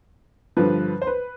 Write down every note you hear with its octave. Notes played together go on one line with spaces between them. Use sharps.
G2 D3 F3 B4
C5
B4